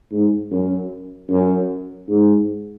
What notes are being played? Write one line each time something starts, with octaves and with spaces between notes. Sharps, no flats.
G#2
F#2
F#2
G#2